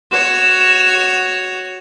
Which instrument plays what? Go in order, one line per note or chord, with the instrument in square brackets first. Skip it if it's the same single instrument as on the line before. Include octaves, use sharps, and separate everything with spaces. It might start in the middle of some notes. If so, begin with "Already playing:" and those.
[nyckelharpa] F#4 C#5 [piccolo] E7